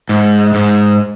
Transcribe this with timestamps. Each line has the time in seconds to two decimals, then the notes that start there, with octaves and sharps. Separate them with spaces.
0.09 G#2
0.54 G#2